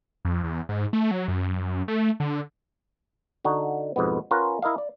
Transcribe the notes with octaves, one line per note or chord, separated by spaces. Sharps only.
F2
E2
G#2
A3
F#3
F#2
F#2
A3
D3
D3 D#4 F#4
F2 G#2 B2 B3
C#4 F4 A#4 B4 F#5
E4 A#4 D#5 F5
D5